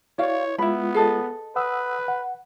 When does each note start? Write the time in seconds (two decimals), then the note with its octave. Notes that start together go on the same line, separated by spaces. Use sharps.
0.19 E4 F#4 C#5 D5 F5
0.58 G#3 B3 E4 F4 B5
0.94 G#4 A4 D#5
1.56 B4 F#5 D#6 E6
2.08 F#5